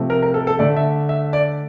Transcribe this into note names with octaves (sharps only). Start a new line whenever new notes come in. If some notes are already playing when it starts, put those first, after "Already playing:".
Already playing: C3 F3 A3
A#4
A#4
A4
A4
D3 A3 D5
E5
E5
D5